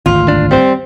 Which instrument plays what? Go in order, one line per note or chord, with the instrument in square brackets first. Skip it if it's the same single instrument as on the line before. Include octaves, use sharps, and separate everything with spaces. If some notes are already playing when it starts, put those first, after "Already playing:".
[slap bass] G#1 D2 [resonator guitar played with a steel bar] F4
[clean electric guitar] D4
[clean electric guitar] G3 C5 [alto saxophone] C4